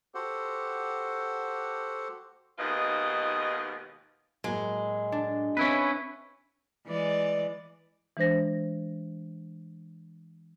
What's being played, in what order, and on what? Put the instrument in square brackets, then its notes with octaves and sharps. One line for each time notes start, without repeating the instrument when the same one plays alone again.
[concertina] F#4 G4 A4 C5 F#5
[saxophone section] D#2 G#2 B2 F4 D#5
[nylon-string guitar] A2 F#3 A#3 [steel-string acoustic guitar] G#3
[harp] D4
[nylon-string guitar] C4 [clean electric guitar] C#4 E4 B4
[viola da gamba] E3 G#3 D5
[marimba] E3 G#3 D4 C5 A#6